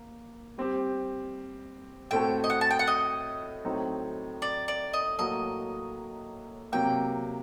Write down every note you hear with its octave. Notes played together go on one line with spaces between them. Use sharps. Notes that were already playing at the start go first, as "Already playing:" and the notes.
Already playing: A#3
G3 C4 G4
A2 A3 C4 F#4 A4 G5
D#5
F#5
A5
G5
F#5
D#5
A2 F#3 C4 D#4
D5
D5
D#5
A2 F#3 A#3 F#4 A4 D#5
C3 F#3 A#3 G5